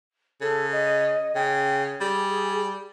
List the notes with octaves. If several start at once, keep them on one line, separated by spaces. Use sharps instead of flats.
C#3 A4
D#5
C#3 G5
G3 G#4